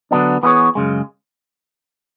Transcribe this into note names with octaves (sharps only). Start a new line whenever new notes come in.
D3 F#3 B3 D4
E3 B3 E4 G#4 C#5
F#2 C#3 G#3